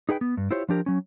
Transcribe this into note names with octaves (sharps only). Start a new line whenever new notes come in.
D#4 G#4 B4 G5
B3
G2
E4 F4 G4 C5 C#5
F3 D4 G4 A#4
F#3 C#4